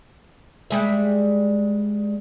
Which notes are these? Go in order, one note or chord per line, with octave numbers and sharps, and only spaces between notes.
G3 G#3 E5